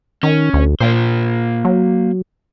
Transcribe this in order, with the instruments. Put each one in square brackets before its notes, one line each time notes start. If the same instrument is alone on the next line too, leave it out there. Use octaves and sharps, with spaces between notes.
[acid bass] D#3 [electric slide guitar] C#4
[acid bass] D2
[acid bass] A#2 [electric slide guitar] A#3 C5
[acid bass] F#3